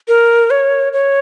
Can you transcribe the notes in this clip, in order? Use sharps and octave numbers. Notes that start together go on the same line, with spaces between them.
A#4
C#5
C#5